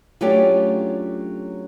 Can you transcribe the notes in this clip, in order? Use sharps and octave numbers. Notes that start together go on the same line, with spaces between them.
F#3 A3 C#4 D4 F4 G4